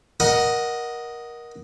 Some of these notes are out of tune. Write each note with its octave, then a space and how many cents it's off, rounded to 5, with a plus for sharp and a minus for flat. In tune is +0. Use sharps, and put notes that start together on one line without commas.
A#4 +20 D#5 +0 F#5 +0